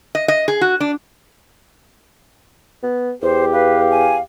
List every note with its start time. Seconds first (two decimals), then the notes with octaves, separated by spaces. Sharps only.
0.15 D#5
0.28 D#5
0.48 G#4
0.61 F#4
0.80 D4
2.83 B3
3.22 E2 G4 C5
3.53 B4 F5
3.91 G#5